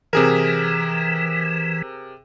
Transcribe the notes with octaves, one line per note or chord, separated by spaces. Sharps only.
C3 E3 G#4 A#4